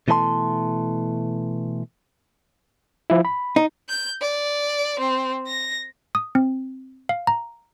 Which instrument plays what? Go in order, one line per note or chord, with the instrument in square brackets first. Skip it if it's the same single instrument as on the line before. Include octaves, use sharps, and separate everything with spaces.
[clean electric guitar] B2 E3 A3 A4 A5 C6
[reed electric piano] F3 E4
B5
[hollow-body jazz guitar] D#4
[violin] G6
D5
C4
A#6
[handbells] D#6
C4
F5
A#5